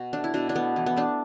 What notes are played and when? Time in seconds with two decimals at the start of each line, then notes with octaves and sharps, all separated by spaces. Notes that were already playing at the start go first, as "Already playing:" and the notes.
Already playing: B2 F#4
0.13 A3 D4
0.24 E4
0.34 B2 D4
0.49 D4
0.55 A3 B3
0.76 E3
0.86 B3
0.96 A3 D4